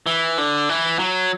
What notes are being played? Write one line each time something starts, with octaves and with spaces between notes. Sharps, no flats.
E3
D3
E3
F#3